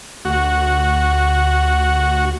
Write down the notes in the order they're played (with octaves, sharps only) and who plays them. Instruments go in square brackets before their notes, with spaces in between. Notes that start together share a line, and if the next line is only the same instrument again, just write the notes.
[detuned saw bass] D2 [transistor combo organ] F#4